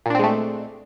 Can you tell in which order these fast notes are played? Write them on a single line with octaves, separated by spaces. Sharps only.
A#2 D4 C4 G#3 A3